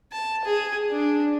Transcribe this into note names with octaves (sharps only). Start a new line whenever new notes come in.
A5
G#4
D4